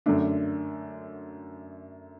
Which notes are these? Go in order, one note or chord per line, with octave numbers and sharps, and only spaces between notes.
F#2 D3 A3 D4